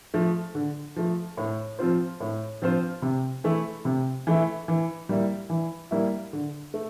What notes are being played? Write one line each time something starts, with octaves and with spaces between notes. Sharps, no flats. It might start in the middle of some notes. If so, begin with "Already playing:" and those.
F3 A3
D3
F3 A3
A2
F3 C4 F4 C5
A2
F3 C4 F4 C5
C3
E3 A3 E4
C3
E3 A3 E4
E3
G3 A#3 E4
E3
G3 A#3 E4
D3
A3